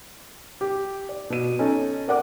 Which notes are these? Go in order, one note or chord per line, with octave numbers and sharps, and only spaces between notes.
G4
D5
B2 D#7
C#4 D#4 A4
A#4 D5 F#5 D6